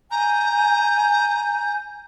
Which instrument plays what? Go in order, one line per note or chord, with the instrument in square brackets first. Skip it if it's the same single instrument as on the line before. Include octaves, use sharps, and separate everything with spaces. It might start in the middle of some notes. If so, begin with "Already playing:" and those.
[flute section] G#5 G6 [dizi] A#5